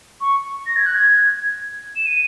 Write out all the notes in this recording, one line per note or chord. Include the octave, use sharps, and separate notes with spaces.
C#6
A#6
G#6
F#6
G#6
E7
D#7